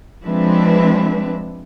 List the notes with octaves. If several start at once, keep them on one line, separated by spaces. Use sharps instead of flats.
F3 G#3 C4 D4 B4 E5